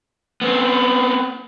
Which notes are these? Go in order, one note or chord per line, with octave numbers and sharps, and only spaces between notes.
B3 C4